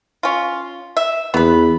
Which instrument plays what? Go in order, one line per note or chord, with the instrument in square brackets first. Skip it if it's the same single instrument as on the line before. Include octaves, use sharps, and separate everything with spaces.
[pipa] C#4 F4
E5
[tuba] E2 [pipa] B3 B4